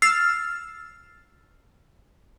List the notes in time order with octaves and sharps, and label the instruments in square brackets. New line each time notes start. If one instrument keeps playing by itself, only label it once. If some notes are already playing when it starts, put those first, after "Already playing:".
[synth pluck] E6 F6 A6 [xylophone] C7